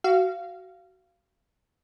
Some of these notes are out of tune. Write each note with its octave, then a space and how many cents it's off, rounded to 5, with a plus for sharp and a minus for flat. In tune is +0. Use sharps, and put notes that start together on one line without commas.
F#4 +20 F5 -20